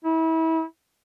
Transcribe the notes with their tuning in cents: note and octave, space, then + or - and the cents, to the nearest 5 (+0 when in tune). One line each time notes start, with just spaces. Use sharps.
E4 -30